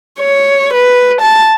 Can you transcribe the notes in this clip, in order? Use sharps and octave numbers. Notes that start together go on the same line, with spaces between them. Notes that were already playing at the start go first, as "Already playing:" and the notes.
C#5
B4
A5